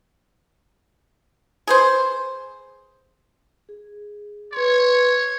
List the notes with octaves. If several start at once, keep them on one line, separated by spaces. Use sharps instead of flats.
G#4 B4 C5
G#4
B4 C#5 C6